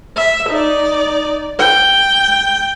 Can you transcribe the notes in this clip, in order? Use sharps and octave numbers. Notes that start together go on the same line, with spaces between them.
E5
D#4 D5
G5